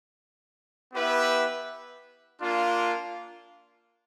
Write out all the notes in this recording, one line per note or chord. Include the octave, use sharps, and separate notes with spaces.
B3 E4 G4 B4 E5
A#3 D4 F4